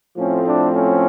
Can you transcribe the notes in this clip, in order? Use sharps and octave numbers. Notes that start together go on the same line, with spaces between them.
A2 F3 A3 C4 C#4
D4
C#4